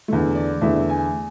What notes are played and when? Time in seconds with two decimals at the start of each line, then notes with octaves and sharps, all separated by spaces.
0.08 E2 D3 A3
0.35 D5
0.61 E2 D3 A3 E5
0.89 G#5